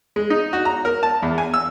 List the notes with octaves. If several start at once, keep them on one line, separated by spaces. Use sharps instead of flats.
G#3
D#4
F#4
A#5
A#4
A5
E2
G#5
E6